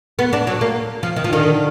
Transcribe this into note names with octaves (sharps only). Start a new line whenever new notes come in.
B3
D4
F#3
A#3
F3
D#3
F3
D3 D#3